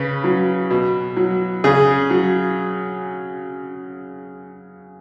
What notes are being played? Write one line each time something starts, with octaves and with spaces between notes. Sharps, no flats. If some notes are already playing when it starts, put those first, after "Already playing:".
Already playing: C#3 B4
F#3
B2
F#3
C#3 G#4
F#3